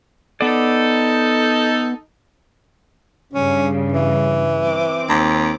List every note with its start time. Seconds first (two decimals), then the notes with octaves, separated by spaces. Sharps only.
0.41 B3 D#4 A4 D5
3.34 G2 C#3 C#4
3.92 E3
4.65 C4 D6
5.09 D#2